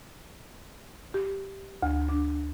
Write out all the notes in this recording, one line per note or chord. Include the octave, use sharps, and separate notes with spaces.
G4
D2
D4